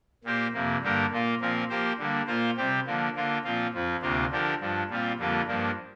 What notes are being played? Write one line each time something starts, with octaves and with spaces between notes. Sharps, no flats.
A#2 A#3 G4 C5
F2 C3 A#3
G2 D3 A#3 G4 A#4
A#2 A#3 F4
A#2 F3 C4 A#4
F3 A#3 G4 C5
D3 G3 A#3
A#2 A#3 F4 C5
C3 G3 C4 G4
D3 F3 A#3
D3 A#3 F4
A#2 F3 C4 F4
F2 F3 C4
D2 C3 A#3 D4 F4
D3 F3 D4 G4 A#4
G2 F3 D4
A#2 G3 C4 F4
F2 D3 G3 A#3 F4
G2 F3 A#3 D4